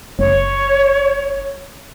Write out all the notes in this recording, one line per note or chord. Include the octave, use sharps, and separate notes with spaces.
F#1 C#5